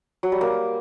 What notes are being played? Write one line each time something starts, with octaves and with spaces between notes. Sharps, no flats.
F#3
G3
A#3